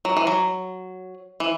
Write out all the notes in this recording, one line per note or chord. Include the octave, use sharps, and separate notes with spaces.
F#3
E3
F#3
E3